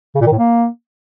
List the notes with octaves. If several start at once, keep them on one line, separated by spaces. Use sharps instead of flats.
C#3
A#2
D#3
A2
A#3